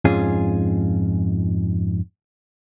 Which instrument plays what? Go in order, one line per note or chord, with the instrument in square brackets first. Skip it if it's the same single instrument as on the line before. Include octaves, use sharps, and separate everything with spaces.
[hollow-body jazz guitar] F2 G#2 C#4 F4 G#4